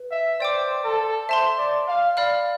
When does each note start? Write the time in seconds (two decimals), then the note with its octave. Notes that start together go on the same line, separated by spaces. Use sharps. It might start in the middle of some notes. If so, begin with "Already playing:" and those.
Already playing: B4
0.11 E5
0.40 C5 D5 G5 D6
0.84 A4
1.29 C5 E5 A5 C6
1.58 D5
1.87 F5
2.17 D5 F5 B5 F6